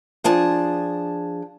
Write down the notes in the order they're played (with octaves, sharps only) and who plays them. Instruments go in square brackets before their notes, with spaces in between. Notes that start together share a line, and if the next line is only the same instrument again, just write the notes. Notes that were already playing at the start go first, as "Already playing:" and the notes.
[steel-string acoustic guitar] F3 D4 G#4 A5